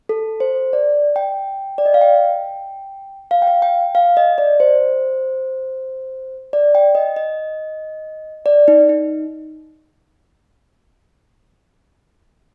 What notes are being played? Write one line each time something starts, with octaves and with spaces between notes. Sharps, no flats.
A4
C5
D5
G5
D5
D#5
F5
G5
F5
G5
F5
G5
F5
D#5
D5
C5
D5
G5
D#5
D#5
D5
D#4
D#4